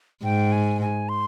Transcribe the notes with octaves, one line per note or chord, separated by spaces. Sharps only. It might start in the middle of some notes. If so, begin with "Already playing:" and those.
G#2 G5
G#5
G#5
C6